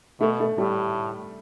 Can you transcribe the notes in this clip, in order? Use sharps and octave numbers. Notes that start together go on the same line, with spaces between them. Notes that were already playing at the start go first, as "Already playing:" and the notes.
B2 A3
A3
A2 G3